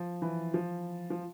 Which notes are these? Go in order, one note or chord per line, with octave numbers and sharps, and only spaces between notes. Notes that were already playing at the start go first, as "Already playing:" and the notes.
Already playing: F3
E3
F3
F3